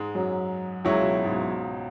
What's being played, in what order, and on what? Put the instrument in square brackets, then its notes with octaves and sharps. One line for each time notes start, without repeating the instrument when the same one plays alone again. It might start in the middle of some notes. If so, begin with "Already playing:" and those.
Already playing: [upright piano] G#2 G#3
F#2 F#3
[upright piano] C#2 C#3 [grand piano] F#3 E4 C#5
[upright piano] B2
G#2
B2